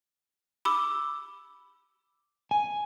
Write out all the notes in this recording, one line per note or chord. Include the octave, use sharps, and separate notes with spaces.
B5 D6 E6
G#5